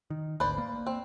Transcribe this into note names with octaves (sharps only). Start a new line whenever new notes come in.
D#3
G#1 D2 B4 C5 D5
A#3
C4